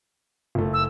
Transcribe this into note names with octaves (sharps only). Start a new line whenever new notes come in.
F#1 A3
E6